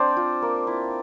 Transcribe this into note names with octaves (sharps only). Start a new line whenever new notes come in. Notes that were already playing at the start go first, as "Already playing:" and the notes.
Already playing: C4 D4 C5 D5 G5
F4
A#3
E4